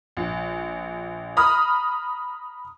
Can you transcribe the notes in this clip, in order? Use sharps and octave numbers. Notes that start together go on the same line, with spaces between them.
A#1
A#5 B5 D#6 F6